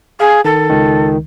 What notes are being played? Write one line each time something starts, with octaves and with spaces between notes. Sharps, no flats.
G#4 F5
D#3 A4
C#2 D#3